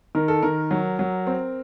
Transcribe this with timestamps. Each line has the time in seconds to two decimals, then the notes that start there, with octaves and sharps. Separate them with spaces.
0.15 D#3 A#4
0.28 A4
0.43 D#3 A#4
0.71 F#3
0.99 F#3
1.27 C4